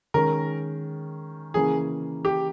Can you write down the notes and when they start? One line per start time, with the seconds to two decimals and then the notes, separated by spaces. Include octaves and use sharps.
0.14 D#3 G#3 C#4 A#4
1.54 C#3 E3 A#3 C#4 G#4
2.25 G4